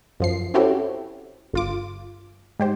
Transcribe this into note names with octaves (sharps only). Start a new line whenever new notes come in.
F#2 F3 C7
C4 C#4 E4 F#4 G4 A4
G1 F4 D6
G#2 G4 C5